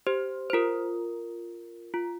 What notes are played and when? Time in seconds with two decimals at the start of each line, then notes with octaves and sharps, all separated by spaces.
0.07 G4 C5
0.50 C5
0.53 F4 A#4
1.94 F4